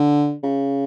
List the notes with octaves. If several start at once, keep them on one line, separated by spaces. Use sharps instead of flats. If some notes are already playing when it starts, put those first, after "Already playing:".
Already playing: D3
C#3